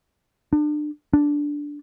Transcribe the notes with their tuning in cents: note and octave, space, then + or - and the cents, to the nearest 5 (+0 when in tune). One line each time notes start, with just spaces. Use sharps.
D4 +30
D4 -5